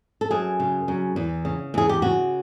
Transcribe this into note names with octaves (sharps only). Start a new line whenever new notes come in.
A4
F#2 G#4
C#3
F#2
E2
C#3
E2 G#4
G4
C#3 F#4